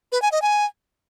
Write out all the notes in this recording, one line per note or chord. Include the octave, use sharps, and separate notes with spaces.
B4
G#5
D#5
G#5